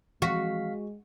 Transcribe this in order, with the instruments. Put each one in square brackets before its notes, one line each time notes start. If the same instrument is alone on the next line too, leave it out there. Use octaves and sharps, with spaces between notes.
[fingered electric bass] E3 F3 C4 [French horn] G#3 [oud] F#4 [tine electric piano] F5 B6